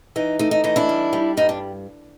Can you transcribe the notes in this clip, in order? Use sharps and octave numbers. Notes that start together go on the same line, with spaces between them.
E3 D#4
A3 D#4
D#4
E3 D#4
D4 E4
G3
G3
G2 D#4
D4